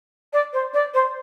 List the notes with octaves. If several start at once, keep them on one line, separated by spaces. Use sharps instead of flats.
D5
C5
D5
C5